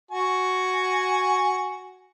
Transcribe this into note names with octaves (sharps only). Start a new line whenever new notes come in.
F#4 G#5